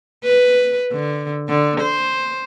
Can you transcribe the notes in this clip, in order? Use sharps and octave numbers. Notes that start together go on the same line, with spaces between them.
B4
D3
D3
C5